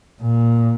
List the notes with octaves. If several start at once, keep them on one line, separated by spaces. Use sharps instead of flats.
A#2